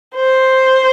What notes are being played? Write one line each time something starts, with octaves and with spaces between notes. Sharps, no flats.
C5